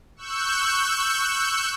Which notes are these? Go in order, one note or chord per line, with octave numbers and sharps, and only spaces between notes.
C#6 E6 F#6 G6